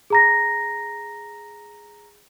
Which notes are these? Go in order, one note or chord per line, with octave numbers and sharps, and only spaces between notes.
G#4 A#5 A#6